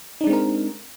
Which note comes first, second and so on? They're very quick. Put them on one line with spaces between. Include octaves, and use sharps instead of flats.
D#4 D4 G#3 C4 A#4